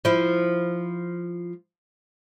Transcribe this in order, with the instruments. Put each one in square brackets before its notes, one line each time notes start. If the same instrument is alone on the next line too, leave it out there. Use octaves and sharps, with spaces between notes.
[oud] F3 E4